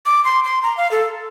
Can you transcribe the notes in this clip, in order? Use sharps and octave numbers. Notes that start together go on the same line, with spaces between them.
D6
C6
C6
A#5
F5
A4